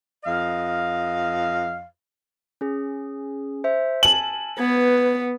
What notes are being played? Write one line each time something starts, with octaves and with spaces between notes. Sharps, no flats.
F2 D#5 F5
C#4 G#4
C5 E5
G#5 A5 F#7
B3 B4 G#6